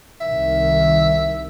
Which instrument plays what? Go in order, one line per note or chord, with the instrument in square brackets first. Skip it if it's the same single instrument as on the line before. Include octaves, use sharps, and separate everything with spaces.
[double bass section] C2 D#3 [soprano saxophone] E5